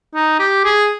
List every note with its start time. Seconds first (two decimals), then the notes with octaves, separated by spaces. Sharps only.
0.15 D#4
0.39 G4
0.64 G#4